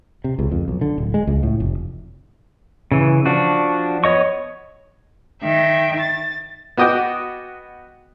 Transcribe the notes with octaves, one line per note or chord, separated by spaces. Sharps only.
C3
C#2
F2
B1
D3
D1
G#3
C#2
A2
F1
C#3 E3
F3 D4 F#4
B3 C#5 D#5 C#6
D#3 E5 G5
A6
B3 F#4 D#5 G5 D6